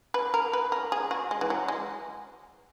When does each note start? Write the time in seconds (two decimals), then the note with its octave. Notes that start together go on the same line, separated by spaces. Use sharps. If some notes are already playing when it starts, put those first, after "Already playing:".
0.14 B4
0.34 A#4
0.53 B4
0.72 A#4
0.92 G#4
1.11 F#4
1.31 G#3
1.41 E3
1.50 F#3
1.68 G#3